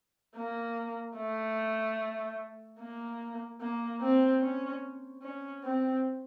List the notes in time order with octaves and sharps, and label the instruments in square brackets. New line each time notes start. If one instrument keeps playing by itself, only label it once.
[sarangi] A#3
A3
A#3
A#3
C4
C#4
C#4
C4